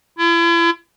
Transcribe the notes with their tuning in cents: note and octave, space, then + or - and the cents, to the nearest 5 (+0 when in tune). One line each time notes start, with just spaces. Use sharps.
E4 +40